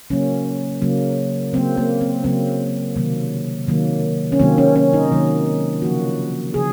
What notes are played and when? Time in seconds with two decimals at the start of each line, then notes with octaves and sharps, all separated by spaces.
0.10 C#3 F#3 A#3 C#4
0.82 C#3 F#3 A#3
1.53 C#3 F#3 A#3 C4
1.77 A#3
2.01 C4
2.24 C#3 F#3 A#3 C4
2.96 C3 D#3 F#3 A#3
3.67 C3 D#3 F#3 A#3
4.32 C#4
4.39 C3 D#3 F#3 A#3 C4
4.58 C#4
4.76 C#4
4.93 D#4
5.11 C3 D#3 F#3 A#3
5.82 C#3 F3 A#3 F#4
6.54 C#3 F3 G#4